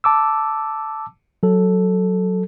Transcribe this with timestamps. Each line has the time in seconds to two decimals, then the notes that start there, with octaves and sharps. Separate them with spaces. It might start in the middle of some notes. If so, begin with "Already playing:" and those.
0.04 A5 D6 E6
1.43 F#3 A4